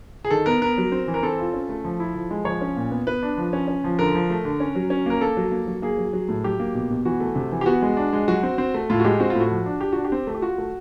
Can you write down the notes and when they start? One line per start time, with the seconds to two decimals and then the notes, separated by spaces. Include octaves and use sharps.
0.25 G#4
0.30 D#3 A4
0.46 B3 A#4
0.62 B3 A#4
0.78 F#3
0.92 C4
1.08 E3
1.14 A#4
1.23 C4 A4
1.39 F4
1.54 C#4
1.69 A3
1.84 F3
2.00 E4
2.15 F3
2.31 G#3
2.45 F3 C#5
2.61 C#4
2.77 A#2
2.91 B3
3.07 B3 B4
3.23 D4
3.37 F3
3.53 C#4
3.68 C#4
3.84 F3
3.99 D3 A#4
4.14 F3
4.30 A3
4.45 D3
4.60 C#4
4.75 F#3
4.90 C#4
5.06 A#3 A#4
5.21 A#3 A4
5.37 F#3
5.52 A#3
5.67 F#3
5.82 A#3 G#4
5.98 F#3
6.13 F#3
6.29 A2
6.44 F#3 G4
6.60 A#3
6.74 B2
6.90 B2
7.05 E3 F#4
7.20 A3
7.36 C3
7.52 E3
7.61 G4
7.66 B3 F#4
7.82 G#3
7.97 D4
8.13 G#3
8.28 F#3 F#4
8.43 C4
8.58 C4
8.74 A3
8.90 A2 F4
9.00 F#4
9.05 G#3 G4
9.20 C4 F#4
9.30 F4
9.35 A2
9.41 F#4
9.51 F3
9.66 D4
9.81 D4 G4
9.92 D4 F#4
10.04 G4
10.12 C4
10.27 A3
10.35 G4
10.42 F4 F#4
10.58 A3